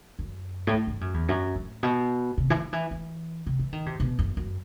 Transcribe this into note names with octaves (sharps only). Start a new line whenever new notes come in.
F#2
A2
G2
G2
F#2
E2
F#2
A2
B2
C3
E3
D#3
E3
E3
C3
E3
D#3
C3
B2
F#2
F#2